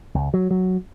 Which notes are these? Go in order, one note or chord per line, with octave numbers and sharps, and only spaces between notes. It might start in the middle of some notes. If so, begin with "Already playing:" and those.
C#2
F#3
F#3